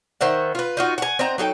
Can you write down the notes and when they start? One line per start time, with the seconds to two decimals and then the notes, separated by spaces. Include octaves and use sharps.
0.21 D#3 C5 E5 F#5
0.55 F4 B4
0.77 D#4 F4 F#4
0.98 F#5 G#5
1.19 C4 D#4 F#5 A#5
1.38 F#3 D#4 A4 G5